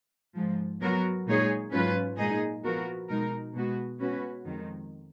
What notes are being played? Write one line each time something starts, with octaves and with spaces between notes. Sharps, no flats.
G#2 F3 G#3
F#3 B3 F#4 A#4
A#2 G#3 D#4 G#4 C#5
G#2 F#3 C#4 F4 B4
A#2 G#3 D#4 G#4 D#5
F3 B3 F#4 A#4
B2 G#3 D#4 A#4
B2 G#3 B3 F#4
B2 G#3 C#4 F#4 B4
F2 D#3 G#3